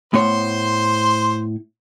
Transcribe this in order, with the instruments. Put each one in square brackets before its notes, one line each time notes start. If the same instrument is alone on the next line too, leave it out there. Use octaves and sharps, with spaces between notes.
[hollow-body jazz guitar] A2 B3 C#5 [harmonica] C5 C6